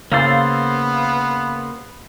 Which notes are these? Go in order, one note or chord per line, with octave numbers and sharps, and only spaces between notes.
C#3 A#3 B3 C5 F5 E6 A6